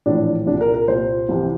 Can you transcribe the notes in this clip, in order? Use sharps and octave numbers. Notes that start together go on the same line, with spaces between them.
A#1 A2 E3 D4
C2 A#2 D4
A#4
A#4
C2 A#2 C5
C2 C3 E3